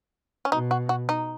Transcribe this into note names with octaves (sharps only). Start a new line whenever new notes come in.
C#4
B2 D#4
F#4
F#4
D#4